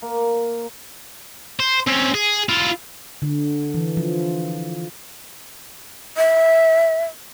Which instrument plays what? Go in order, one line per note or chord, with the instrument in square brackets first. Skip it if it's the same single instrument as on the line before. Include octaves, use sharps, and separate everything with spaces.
[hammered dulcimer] A#3
[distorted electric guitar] C5
C4 C#4
G#4
E4 F4
[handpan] D3
E3
F3
[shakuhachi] E5